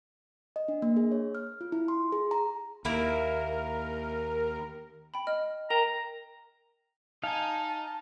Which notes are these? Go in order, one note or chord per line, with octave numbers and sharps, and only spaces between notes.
D#5
D4
A#3
G#4
C#5
F6
F4
E4
C6
G#4
A#5
D#2 A#3 E4 A#4
G5 B5
D#5 F6
A#4 G5 A#5 E7
D#4 F5 G#5 A5